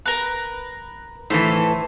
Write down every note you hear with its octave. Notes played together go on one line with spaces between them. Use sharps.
A#4 B4
A2 E3 A4 C5